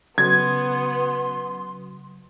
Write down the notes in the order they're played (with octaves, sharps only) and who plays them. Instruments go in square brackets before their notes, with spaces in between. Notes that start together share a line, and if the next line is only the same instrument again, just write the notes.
[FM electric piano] C#3 F#3 [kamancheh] B3 [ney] C6 [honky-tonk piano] G#6